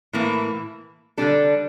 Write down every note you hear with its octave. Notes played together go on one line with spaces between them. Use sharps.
A2 E3 A#3 E4
D3 G3 D4 A4